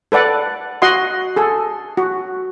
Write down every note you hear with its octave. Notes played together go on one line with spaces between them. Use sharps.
A4 B4 D5 F#5
F#4 D#5 F#5 C6
G#4 A4
F#4